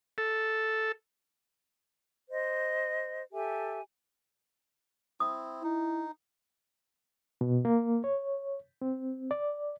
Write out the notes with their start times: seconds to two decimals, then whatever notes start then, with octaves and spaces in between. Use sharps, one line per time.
0.18 A4
2.29 C5 D#5
3.33 G4 A4 E5 G#5
5.20 C4 E4 D#6
5.64 D#4 E4
7.41 B2
7.65 A#3
8.04 C#5
8.82 C4
9.31 D5